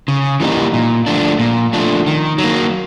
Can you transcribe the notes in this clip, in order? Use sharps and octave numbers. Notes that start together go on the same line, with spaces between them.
C#3
E3 G3 A#3 D#4
A#2
F3 A3 D4
A#2
F3 A3 D4
D#3
F#3
A#3